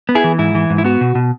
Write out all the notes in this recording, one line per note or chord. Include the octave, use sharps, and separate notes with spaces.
B3
E4 G#4
E3
G#2 E4
E3
G#2
E4
B3 F#4
B2
B2